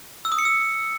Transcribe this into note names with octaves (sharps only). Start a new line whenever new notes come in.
E6
D#6
C#7
E6